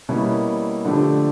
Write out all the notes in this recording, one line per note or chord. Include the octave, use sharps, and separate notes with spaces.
B2 G3 A#3 C#4 E4
D3 F3 A3 D4 G4